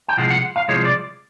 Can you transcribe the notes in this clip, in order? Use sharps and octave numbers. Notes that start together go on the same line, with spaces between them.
G5
C2 C3 F3 G#3 F#5
F#5
F5
C2 C3 F3 G#3 C#5
D5